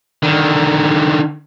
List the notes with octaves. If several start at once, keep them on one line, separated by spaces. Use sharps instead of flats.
D3 D#3